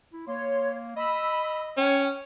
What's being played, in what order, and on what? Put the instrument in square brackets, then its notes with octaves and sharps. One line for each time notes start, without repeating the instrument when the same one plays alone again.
[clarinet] E4
[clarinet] A#3 [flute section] C#5 C6
[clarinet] D#5 [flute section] B5 E6
[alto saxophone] C#4 [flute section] G5